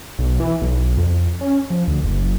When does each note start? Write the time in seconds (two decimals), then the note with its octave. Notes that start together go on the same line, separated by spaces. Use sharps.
0.19 B1
0.40 E3
0.62 B1
0.97 F2
1.41 C#4
1.70 F3
1.88 D2
2.04 F#1